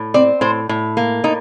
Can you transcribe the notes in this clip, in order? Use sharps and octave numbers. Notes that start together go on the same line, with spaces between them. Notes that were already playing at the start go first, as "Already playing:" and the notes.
Already playing: A2
C4 D5
A2 C5
A2
A#3
A2 D#4